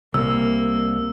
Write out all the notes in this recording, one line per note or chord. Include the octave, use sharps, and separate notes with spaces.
C2 A#3 E6